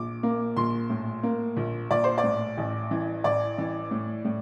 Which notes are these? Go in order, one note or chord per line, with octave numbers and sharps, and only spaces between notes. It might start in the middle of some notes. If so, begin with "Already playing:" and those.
Already playing: A#1 D6
A#3
A#1 C6
A2
A#3
A#1
A#1 D5
C5
D5
A2
A1
E3
A1 D5
E3
A2
A2